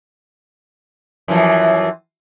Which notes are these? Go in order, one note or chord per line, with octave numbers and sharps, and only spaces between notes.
F#2 E3 F3